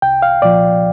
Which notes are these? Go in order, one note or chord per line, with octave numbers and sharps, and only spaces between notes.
C2 G5
F5
A#2 F3 D5